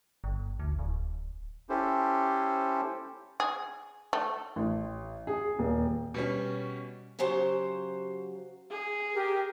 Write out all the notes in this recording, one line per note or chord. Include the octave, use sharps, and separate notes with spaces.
G1
D2
D1
C#4 E4 G4 A4 C5
G#4
A3
A1
G#4
D#1
B2 G3 C#4
C#3 F#3 G4 C5 A5
G#4
G4 A#4